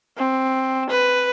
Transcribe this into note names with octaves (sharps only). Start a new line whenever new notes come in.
C4
B4